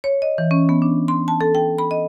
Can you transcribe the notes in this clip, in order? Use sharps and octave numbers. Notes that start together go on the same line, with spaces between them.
C#5
D#5
E3
C#4
B3
D4
C6
A5
A4
G5
B5
D#5